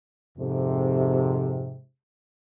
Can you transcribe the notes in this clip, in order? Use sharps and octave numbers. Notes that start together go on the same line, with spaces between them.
F2 G#2 C3